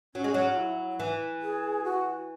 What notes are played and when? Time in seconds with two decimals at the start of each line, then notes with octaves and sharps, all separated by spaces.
0.15 F#3 C#4
0.24 G#3
0.34 F#3
0.50 F#4
0.57 E4
1.00 E3
1.42 G#4
1.84 F#4